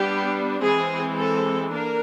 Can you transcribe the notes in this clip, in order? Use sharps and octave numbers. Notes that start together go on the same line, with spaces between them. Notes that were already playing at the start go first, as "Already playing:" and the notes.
Already playing: G3 B3 D4 G4
E3 G#3 C4 G#4
A4
A#3 D4 A#4